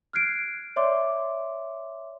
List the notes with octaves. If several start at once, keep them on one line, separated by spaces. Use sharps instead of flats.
F6 F#6 G#6 C7 D7
C#5 D5 E5 C6 D6